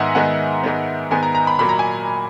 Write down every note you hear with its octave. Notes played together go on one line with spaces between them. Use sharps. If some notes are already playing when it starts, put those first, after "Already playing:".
Already playing: G#2 D#3 G#3 B3 E5 F#5 G#5
G#2 D#3 G#3 B3 F#5
G#2 D#3 G#3 B3
G#2 D#3 G#3 B3 G#5
A#5
A#5
B5
A#2 F#3 A#3 B5
A#5
G#5